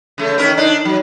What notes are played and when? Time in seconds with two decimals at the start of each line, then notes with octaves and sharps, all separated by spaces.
0.18 C#3 A3
0.38 D#3 C#4 A#4
0.57 D4 D#4
0.85 F#3